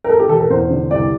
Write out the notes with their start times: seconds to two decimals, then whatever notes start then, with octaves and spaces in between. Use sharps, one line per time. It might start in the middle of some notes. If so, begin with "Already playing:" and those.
0.04 A#4
0.09 A3 A4
0.20 G4
0.29 E1 A4
0.40 A#4
0.50 E2 C5
0.70 D3
0.91 C2 D5